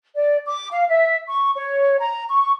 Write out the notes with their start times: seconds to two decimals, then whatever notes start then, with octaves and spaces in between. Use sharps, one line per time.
0.15 D5
0.46 D6
0.71 F5
0.88 E5
1.29 C#6
1.56 C#5
2.00 A#5
2.30 C#6